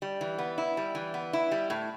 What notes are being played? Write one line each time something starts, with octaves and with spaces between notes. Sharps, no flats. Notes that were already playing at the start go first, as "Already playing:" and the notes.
G3
E3
B3
E4
G3
E3
B3
E4
G3
A2